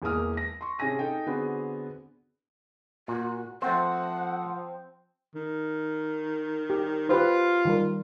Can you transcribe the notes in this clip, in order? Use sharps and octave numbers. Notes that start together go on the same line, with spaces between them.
E1 E2 G#3 A#3 D#6 F6
A#6
C6 C#6
C3 C#4 G#4 G#5 A#6 D#7
D#4 A4 G5
D3 B3 C4 F#4 G#4
A#2 F#4
F3 A3 C4 C5 F#5
D#3
G4
F4 G4 B4 C5
D#3 G3 A#4